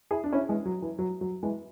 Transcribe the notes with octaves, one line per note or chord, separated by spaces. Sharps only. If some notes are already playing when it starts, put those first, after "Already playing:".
E4 G#4
D4
C#4 E4
E3 G#3
F#3
E3
F#3
F#3
E3 G#3